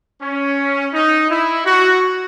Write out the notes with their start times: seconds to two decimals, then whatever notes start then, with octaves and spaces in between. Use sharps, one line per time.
0.22 C#4
0.94 D#4
1.30 E4
1.66 F#4